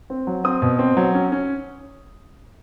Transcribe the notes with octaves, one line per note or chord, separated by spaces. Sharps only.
C4
F#3
C4 D#6
B2
C4
F#3
C#4
C#4